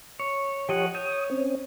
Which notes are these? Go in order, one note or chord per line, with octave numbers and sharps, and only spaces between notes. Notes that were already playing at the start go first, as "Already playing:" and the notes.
C#5
F3 G4 C#5 D#5 F#5
C#5 D#6 G6
C4 C#4